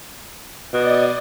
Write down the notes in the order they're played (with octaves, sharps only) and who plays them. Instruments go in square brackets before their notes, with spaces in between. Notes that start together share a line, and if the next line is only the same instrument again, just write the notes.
[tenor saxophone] B2 [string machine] D5 D#5